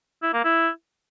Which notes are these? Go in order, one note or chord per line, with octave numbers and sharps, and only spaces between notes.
E4
A#3
E4